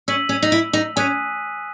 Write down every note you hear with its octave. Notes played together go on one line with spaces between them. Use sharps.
C#4 E6 B6 D#7 F#7
C#4
D#4
E4
D#4
C#4 G#5 D#6 F#6 B6 D#7